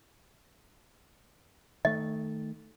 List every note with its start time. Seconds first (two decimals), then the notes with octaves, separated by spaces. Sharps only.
1.85 D#3 A3 D#5